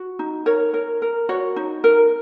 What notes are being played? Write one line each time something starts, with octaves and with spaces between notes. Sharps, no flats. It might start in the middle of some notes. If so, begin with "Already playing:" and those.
Already playing: F#4
D#4
A#4 C#5
A#4
A#4
F#4 C#5
D#4
A#4